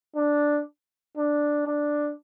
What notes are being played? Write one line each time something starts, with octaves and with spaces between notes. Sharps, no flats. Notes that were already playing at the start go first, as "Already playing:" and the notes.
D4
D4
D4